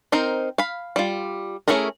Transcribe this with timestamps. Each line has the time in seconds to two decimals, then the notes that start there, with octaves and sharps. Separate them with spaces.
0.12 C4 D#4 A#4 C5
0.58 F5 B5
0.96 G3 F4
1.68 A3 C#4 E4 G#4 A#4